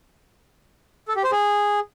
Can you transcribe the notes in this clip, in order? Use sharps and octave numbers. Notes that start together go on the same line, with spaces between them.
A4
G4
C5
G#4